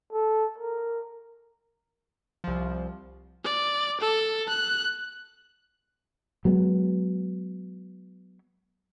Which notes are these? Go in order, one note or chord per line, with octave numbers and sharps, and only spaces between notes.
A4
A#4
C2 F3
D5
A4
F#6
F#3 G#3 B3